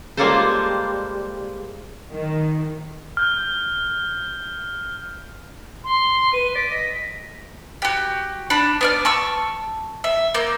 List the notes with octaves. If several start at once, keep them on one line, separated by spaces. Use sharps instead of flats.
G3 G#3 A#3 F4 A4 C5
D#3
F6 G6
C6
B4 D#7
D5 B6
D#5
F#4 G4
D4 B5
B3 D5 F6
A5 C#6 E6
E5
A#3 G6